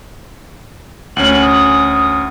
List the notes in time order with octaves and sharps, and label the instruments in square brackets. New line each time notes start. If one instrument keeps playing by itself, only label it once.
[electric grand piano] D2 C#4 [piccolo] F#7
[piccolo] D#6